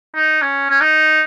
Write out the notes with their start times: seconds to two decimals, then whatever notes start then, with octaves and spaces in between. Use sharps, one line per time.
0.15 D#4
0.42 C#4
0.70 C#4
0.81 D#4